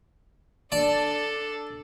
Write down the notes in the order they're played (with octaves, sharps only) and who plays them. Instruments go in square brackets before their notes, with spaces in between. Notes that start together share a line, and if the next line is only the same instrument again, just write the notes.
[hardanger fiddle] D4 A4 [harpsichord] D5 A5